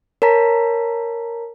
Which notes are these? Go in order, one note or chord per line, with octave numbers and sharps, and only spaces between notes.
A#4 C#5 A5 A#5 B6